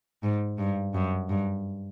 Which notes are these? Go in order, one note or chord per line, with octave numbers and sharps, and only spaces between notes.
G#2
G2
F#2
G2